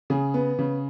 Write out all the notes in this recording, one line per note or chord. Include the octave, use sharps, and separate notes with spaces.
C#3 G#4
B3
C#3